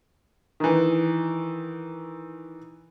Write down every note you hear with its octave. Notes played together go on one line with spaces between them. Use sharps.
D#3 E3